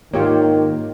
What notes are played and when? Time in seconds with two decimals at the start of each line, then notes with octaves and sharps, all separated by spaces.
0.14 G#2 D#3 A#3 F4 G4 C#5